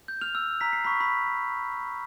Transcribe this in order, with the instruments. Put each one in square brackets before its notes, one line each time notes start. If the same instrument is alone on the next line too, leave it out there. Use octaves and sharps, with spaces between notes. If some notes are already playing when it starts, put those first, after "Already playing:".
[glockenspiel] G6
F6 F7
E6
A#5 B6
C7
B5 C#6 B6
B5 B6